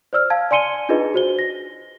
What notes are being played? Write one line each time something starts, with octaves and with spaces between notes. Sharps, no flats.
C5 D5 E6 F6
F5 A5 G#6
D5 G#5 C6 C#7 D#7 G7
D4 D#4 F4 G#4 B4 D#5
F#4 C5 G7
A#6